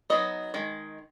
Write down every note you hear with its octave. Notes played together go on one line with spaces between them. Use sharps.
F#3 B3 D#4 D#5
D#3 G#3